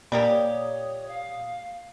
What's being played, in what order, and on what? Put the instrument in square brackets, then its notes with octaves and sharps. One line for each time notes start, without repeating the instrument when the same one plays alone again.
[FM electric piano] A#2 D#6 [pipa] G3 A#3 G4
[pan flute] C#5
F5